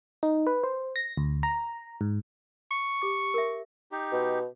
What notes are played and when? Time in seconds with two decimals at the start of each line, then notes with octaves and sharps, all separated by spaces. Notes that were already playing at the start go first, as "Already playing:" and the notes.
0.23 D#4
0.47 B4
0.64 C5
0.96 A#6
1.17 D2
1.43 A#5
2.01 G#2
2.71 C#6
3.02 G4 D6
3.34 A#4 E5
3.92 D#4 G4
4.12 B2